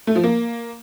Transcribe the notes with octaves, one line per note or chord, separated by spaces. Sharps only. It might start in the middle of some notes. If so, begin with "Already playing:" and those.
A3
F3
A#3